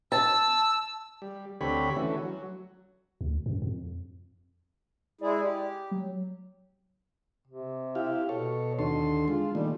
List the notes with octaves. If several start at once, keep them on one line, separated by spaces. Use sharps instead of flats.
A5 E6
G3
D2 D3 C4 G4 C#5 B5
D3 E3 A3 C#4 F#4
F#3
D2
F#2
F2
G#3 E4 G#4 D5
G4
F#3
C3
E4 G4 F5
B2 A4 C#5
D#2 D3 A4 C6
G#3 F4
A#2 D#3 G3 A3